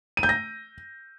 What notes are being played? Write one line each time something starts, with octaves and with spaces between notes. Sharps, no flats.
D#7
G6
A#6